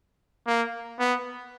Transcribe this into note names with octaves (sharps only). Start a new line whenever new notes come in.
A#3
B3